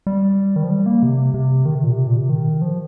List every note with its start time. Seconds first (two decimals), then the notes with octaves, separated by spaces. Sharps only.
0.07 G3
0.56 D#3
0.64 F3
0.71 G3
0.86 A#3
1.03 C3
1.34 C3
1.65 D#3
1.75 C3
1.84 A#2
1.92 C3
2.07 A#2
2.18 C3
2.29 D#3
2.61 F3